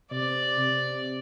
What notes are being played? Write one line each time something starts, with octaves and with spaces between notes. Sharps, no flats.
C3 D5
C3